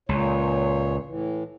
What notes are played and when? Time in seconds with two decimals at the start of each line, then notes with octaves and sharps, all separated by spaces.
0.09 C#2 A#2 C#5
1.06 A2 E3